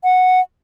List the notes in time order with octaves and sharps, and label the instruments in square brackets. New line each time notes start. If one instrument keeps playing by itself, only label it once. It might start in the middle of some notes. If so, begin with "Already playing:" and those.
[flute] F#5